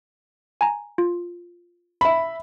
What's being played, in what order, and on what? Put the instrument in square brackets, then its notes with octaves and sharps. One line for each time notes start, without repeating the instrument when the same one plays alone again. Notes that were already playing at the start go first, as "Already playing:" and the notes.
[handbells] G#5 A#5
F4
[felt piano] E5 B5